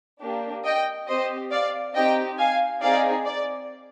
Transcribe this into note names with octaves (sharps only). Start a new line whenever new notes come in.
A#3 D4 G4
D#5 G5
C4 G4 C5 D#5
D5 F5
C4 D#4 G4 D#5 G5
F5 G#5
C4 D#4 G#4 D5 F5
D5